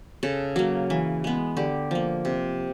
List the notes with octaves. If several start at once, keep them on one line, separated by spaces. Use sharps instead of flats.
C#3 A4
F#3 A#3
E3
G#3 B3
D3 G4
F3 A#3
C3